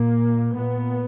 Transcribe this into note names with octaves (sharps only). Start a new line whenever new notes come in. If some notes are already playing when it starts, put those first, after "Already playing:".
Already playing: A#2 A#3
A#2 B3